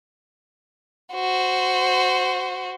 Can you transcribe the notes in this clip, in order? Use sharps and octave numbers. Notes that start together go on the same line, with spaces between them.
F#4 C5